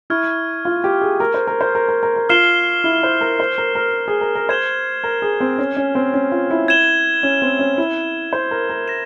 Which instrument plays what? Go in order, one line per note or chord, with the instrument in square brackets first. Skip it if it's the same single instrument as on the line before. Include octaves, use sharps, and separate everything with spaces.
[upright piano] E4 [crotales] C#6 F6 G#6
[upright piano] F4
G4
G#4
A#4
C5
A#4
C5
A#4
A#4
A#4
A#4
[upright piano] F4 [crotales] F6 C7 E7 G7
[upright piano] E4
C5
A#4
C5
A#4
A#4
G#4
A#4
A#4
[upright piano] C5 [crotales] G#6 E7 G7
[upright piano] A#4
G#4
C4
C#4
C#4
C4
C#4
F4
E4
[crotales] G#6 E7 G7
[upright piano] C#4
C4
C#4
E4
C5
A#4
A#4
[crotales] G6 A#6 E7